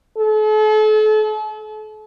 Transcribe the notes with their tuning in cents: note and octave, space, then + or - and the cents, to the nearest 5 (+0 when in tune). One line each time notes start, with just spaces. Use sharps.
A4 -40